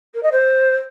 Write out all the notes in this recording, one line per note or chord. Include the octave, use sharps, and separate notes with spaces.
A#4
D#5
C5